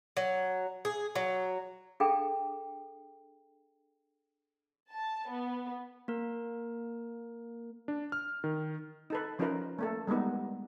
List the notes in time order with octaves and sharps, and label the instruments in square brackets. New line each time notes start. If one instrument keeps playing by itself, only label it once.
[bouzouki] F#3
G#4
F#3
[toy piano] D4 G#4 A4 F5 G5
[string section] A5
B3
[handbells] A#3 A#4
[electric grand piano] D4
F6
D#3
[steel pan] D#4 A4 B4
F3 C#4 D#4 F4 A#4 B4
A3 A#3 A4
G3 G#3 A#3 B3 D#4